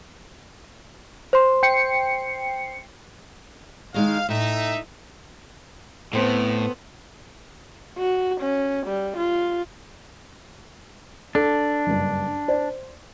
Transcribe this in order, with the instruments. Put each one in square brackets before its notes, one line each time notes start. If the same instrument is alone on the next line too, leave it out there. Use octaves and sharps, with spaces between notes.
[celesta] C5 C6
[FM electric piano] G5 C7 C#7
[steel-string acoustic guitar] D#3 G#3 D#4 [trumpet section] F5
[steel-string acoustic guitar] A2 [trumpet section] D#4 E5
[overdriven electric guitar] A2 [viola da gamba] B3 [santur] C4 A4
[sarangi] F#4
C#4
G3
F4
[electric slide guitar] D4 [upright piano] A4
[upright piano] F#1 G2
C5 D5